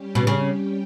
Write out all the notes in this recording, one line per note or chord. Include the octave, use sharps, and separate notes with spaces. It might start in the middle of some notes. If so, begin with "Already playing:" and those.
Already playing: G3 C#4 G4
B2
C#3